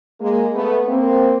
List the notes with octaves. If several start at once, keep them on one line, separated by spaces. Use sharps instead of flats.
G#3 A#3
A3 B3
A#3 C4